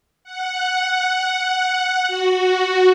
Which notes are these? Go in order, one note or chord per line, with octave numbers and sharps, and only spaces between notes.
F#5
F#4